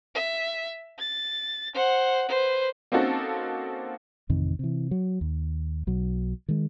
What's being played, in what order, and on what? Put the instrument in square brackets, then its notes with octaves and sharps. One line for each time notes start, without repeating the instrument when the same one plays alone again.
[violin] E5
A6
C5 F#5
B4 C5
[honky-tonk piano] A#3 C4 C#4 D#4 F#4 A4
[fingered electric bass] A1 F2 C3 D#3
C3 E3
F#3
D#2
B1 F#3
D#3 G#3